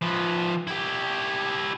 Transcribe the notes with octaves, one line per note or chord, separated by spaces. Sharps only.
F3 B4
E4 G4